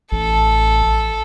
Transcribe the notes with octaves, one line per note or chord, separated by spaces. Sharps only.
A1 A4